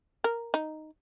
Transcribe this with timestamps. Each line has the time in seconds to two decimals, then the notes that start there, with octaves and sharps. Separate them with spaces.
0.24 A#4
0.54 D#4